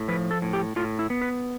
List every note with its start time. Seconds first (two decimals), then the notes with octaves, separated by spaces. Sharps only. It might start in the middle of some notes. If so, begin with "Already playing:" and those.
Already playing: A2
0.08 F3 B4
0.31 A4
0.42 A2
0.53 G4
0.76 A2 F4
0.99 E4
1.10 B3
1.22 B4